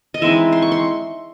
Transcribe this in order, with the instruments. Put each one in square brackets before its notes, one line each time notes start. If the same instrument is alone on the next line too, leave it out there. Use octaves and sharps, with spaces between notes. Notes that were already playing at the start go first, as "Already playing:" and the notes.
[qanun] D#5
E3 G#3 C4 D#4 E5
C6
C#6
C6